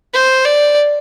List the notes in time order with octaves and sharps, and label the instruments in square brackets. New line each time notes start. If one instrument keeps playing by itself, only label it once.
[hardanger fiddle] C5
D5